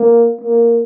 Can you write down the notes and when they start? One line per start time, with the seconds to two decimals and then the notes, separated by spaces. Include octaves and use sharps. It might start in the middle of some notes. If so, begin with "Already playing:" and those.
Already playing: A#3
0.41 A#3